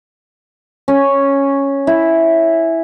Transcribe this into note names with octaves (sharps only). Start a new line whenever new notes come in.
C#4
E4